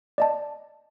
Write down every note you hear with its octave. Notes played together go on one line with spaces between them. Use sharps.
D5 D#5 A5